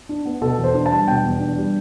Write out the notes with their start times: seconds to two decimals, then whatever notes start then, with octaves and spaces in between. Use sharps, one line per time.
0.09 D4
0.25 B3
0.41 B2 A4
0.58 E2
0.64 C5
0.74 D4
0.86 A5
0.92 G3
1.08 B2 G5
1.23 E2
1.40 D4
1.57 G3